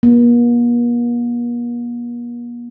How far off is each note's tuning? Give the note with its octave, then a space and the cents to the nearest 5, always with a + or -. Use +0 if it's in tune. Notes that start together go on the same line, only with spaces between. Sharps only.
A#3 +45